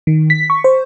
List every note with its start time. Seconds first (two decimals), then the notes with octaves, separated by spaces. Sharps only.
0.07 D#3
0.30 B6
0.50 C#6
0.64 C5